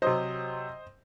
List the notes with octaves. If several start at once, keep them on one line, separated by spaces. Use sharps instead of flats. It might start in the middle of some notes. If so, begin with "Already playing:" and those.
C3 F#3 C5 D#5